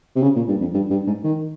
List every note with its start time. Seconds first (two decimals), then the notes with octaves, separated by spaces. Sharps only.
0.16 C3
0.23 C#3
0.35 A#2
0.48 G2
0.61 F2
0.74 G2
0.90 G2
1.07 G#2
1.24 D#3